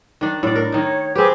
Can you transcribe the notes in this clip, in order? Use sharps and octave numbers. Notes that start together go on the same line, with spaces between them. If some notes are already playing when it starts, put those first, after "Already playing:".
D#3 D4
A2 D5
A#4
D#3 D#4 C#5
C4 G4 G#4 B4 D6